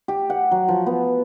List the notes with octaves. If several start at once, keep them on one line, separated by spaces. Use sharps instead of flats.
G4
F#5
F#3
F3
B3